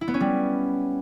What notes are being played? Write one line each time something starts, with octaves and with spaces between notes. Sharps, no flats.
E4
B3
C#4
G3